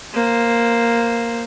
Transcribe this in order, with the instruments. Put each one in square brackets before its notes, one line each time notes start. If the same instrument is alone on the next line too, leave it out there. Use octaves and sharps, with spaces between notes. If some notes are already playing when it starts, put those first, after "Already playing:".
[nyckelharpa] A#3 C5